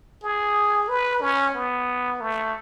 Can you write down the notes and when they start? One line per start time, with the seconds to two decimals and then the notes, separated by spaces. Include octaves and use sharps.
0.23 G#4
0.88 B4
1.21 C#4
1.54 B3
2.21 A3